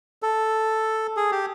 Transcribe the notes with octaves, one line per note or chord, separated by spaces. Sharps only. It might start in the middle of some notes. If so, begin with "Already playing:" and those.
A4
G#4
G4